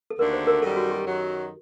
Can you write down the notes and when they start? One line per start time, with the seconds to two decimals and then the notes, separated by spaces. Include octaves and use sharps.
0.10 A4
0.18 D#2 D3 A3 D4 F#4 A#4
0.33 C5
0.47 A#4
0.62 F#2 D#3 G3 A4
0.76 F#4
0.91 G4
1.05 F#2 D#3 F#3